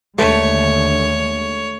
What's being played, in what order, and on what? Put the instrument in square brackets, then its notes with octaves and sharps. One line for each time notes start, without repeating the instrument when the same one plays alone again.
[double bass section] D#2 D3 G#3 [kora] A3 [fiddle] C#5